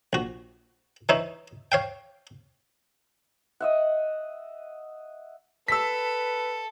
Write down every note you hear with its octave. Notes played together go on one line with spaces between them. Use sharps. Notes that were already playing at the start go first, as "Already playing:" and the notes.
A#1 F#4
E3 D#4 E4 C#5
C#5 F5 G5
D#5 E5 F#5
A4 B4 E6 B6